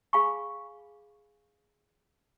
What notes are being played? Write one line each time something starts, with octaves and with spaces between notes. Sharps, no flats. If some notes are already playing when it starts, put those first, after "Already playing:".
G#4 F5 G#5 B5 C#6